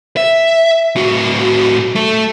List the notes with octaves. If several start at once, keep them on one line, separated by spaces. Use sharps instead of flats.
E5
A2 F#4
A3 A4